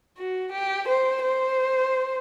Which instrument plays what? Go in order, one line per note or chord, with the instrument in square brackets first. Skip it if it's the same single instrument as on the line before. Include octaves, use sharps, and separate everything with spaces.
[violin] F#4
G4
C5
C5